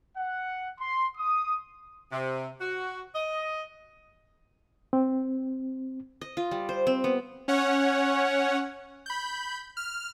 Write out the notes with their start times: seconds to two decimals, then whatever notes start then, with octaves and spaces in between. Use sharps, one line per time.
0.17 F#5
0.80 C6
1.17 D#6
2.12 C3
2.61 F#4
3.15 D#5
4.93 C4
6.21 D#5
6.37 F4
6.51 G3
6.69 C5
6.87 C4
7.04 B3
7.48 C#4 C#5 F#5
9.06 B5 G6
9.77 F6